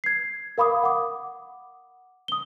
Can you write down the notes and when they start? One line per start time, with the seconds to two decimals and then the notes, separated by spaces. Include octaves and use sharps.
0.04 G#6 C7
0.58 A#4 F5 B5 D6 D#6
0.83 F#5 D6
2.28 D#6 G7